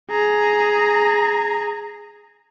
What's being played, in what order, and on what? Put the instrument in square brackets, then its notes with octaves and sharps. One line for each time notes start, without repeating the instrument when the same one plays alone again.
[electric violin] G#4 A#5